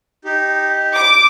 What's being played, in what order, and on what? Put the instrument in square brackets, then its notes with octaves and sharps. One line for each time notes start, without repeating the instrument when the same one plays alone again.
[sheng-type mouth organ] D#4 G4
[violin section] D6